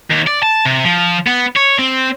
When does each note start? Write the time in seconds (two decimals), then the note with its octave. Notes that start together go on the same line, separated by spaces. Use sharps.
0.10 D#2
0.27 D5
0.43 A5
0.65 C3
0.85 F3
1.26 B3
1.56 C#5
1.79 C4